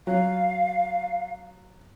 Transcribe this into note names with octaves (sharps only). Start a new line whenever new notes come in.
F#3 F5